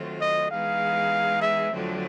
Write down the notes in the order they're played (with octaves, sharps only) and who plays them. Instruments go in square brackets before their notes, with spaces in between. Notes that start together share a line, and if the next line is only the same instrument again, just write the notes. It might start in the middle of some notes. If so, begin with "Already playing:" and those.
Already playing: [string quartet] D#3 F#3 A3 C4 F4
[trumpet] D#5
[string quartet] E3 G#3 B3 D#4 G#4 [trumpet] F5
[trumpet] E5
[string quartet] F2 D3 F#3 A3 C4